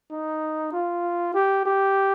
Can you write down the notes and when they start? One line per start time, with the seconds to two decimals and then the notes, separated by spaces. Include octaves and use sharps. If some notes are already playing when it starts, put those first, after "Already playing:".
0.11 D#4
0.72 F4
1.34 G4
1.65 G4